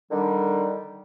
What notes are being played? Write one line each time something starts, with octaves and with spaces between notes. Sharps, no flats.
D3 D#3 G3